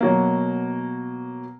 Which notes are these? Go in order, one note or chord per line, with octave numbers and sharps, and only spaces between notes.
B2 F#3 A#3